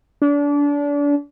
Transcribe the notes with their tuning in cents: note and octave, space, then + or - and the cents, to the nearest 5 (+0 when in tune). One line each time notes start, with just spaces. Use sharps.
D4 -30